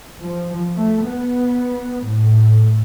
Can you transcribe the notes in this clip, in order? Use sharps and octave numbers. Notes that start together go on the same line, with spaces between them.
F3
A3
B3
A2